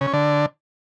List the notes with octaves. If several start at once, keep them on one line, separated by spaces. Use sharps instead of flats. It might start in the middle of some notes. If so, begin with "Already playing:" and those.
C#3
C#4
D3